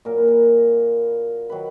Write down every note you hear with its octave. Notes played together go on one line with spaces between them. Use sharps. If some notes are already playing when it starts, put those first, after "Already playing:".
A#2 F#3 A#4
B4
A#4
D#3 F#3 B4